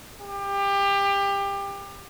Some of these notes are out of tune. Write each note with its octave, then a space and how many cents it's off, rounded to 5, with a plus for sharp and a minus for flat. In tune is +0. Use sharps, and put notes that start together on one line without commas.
G4 +25